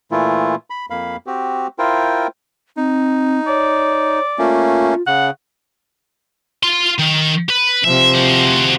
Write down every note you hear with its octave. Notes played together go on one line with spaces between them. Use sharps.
A#2 E3 A3 E4 F4
B5
F2 A#3 F5 B5
C4 F#4 G4
E4 F4 A#4 C5 G5
C4 D#4
C#5 D5
A3 A#3 C#4 F4
C#3 F#5
F4 C6
D#3
B4
C3 F3 E5
F#4 C5